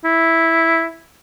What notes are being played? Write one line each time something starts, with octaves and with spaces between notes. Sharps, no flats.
E4